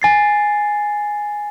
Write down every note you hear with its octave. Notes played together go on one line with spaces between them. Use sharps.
G#5 A6 C7